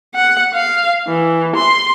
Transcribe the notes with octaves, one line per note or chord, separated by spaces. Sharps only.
F#5
F5
E3
C6